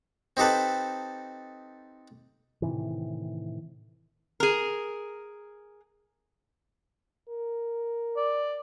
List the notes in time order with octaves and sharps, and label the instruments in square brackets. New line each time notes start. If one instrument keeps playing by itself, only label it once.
[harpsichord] C4 D#4 G4 A4 B4
[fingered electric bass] A2 C3 D#3 E3
[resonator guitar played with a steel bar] G#4 A#4
[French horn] A#4
[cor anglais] D5